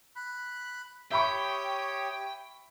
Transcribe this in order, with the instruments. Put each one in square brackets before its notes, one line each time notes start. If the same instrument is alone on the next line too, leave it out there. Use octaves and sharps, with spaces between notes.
[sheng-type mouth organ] B5 F#6
[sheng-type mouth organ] G4 C#5 D#6 [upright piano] E5 B5 C#6 [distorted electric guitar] G5